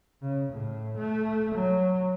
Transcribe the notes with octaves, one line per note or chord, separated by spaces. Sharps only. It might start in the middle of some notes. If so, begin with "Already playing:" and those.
C#3
A2
A3
F#3